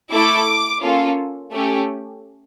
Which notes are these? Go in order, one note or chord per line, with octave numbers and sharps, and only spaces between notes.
A3 E4 A4 D6
A#3 C#4 F4 A4
A3 C#4 G4